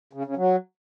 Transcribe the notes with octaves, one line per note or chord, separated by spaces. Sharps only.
C#3
C#3
F#3